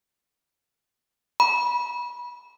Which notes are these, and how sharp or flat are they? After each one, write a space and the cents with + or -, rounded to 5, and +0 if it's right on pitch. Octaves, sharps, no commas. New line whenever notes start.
B5 -25